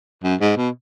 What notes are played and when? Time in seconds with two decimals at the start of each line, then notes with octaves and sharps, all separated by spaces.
0.23 F#2
0.41 G#2
0.57 B2